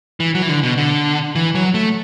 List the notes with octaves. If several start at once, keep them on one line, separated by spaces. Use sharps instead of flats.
E3
F#3
E3
D3
B2
D3
E3
F#3
A3